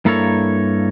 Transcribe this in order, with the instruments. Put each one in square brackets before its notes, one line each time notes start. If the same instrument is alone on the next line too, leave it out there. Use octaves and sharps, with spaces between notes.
[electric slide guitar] G2 A#3 E4 A4 A#4 C#5